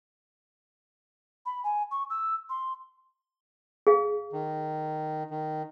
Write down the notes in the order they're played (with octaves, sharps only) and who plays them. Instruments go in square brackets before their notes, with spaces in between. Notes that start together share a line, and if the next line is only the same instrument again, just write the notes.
[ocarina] B5
G#5
C#6
E6
C6
[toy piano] G#4 F5
[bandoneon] D#3
D#3